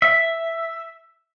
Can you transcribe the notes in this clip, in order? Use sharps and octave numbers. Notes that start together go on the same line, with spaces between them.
E5